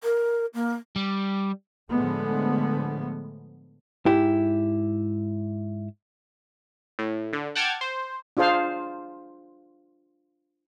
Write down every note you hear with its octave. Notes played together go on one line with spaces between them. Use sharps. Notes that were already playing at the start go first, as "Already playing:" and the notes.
A#4
A#3
G3
A2 D3 F3 G#3 A3 B3
G#2 E4 G4
A2
D3
F#5 G5 A5 D6 F6 G#6
C5
D4 F4 G#4 C5 F5